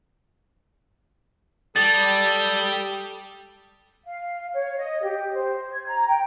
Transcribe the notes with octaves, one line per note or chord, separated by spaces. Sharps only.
G3 A4 D#6 A6 F#7
F5
C#5
D#5
G4
C5
G#6
A#5
G5